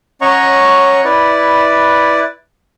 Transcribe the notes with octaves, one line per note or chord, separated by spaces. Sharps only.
C#4 C#5 D#5 F#5 A#5 C#6
E4 B4 D5